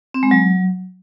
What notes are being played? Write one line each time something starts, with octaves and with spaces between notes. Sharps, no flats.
C4
G#3
F#3